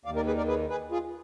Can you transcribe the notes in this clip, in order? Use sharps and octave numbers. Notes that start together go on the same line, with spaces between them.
D#2 D#3 D5 F5
A#4 D5
G#4 B4
A#4 D5
G#4 B4
G#4 B4
F4 G#4